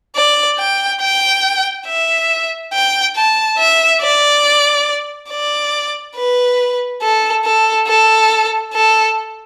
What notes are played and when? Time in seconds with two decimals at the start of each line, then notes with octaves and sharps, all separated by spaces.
0.16 D5
0.59 G5
1.01 G5
1.86 E5
2.73 G5
3.16 A5
3.58 E5
4.02 D5
5.30 D5
6.16 B4
7.02 A4
7.45 A4
7.87 A4
8.73 A4